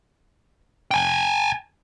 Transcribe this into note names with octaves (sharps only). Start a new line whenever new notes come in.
G5 G#5